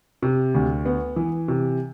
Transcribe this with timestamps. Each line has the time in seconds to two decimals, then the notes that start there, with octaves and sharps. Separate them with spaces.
0.22 C3
0.55 D2
0.86 B3
1.16 E3
1.48 C3